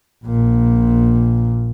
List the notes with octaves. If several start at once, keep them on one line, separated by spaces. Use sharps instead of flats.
A#1 A#2